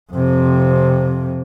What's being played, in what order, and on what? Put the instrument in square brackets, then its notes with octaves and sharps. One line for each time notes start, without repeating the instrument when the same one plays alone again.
[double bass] F2 C3